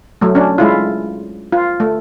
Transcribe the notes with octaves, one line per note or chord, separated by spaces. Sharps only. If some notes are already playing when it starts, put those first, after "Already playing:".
F#3 A3
C#4 D4
G#3 E4 F4
F4
A3